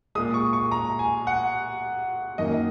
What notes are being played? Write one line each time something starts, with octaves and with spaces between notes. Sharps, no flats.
A#2 G#3 D#6
C#6
C#6
A#5
G#5
F#5
F#2 D#3 A#3 D#5